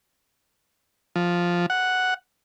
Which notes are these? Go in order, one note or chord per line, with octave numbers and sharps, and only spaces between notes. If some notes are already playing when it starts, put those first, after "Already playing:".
F3
F#5